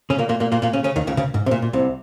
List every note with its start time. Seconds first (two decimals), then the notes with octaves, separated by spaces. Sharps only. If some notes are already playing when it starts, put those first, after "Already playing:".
0.10 C#3 C#4
0.18 A#2 A#3
0.29 A#2 A#3
0.40 A#2 A#3
0.52 A#2 A#3
0.62 A#2 A#3
0.73 C#3 C#4
0.84 C#3 C#4
0.96 D#2 D#3
1.07 C#2 C#3
1.17 C#2 C#3
1.34 G#2
1.46 C3
1.51 A#2
1.62 A#2
1.73 C2 C3